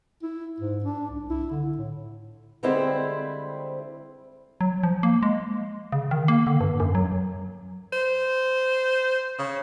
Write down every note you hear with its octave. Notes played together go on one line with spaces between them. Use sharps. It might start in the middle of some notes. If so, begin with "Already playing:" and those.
E4
G#2
D4
C2
E4
D3
A2
D3 G3 G#3 C4 E4 C5
F#3
F3
A#3
G#3
C#3
D#3
A#3
D3
G2
F#2
F#3
C5
C#3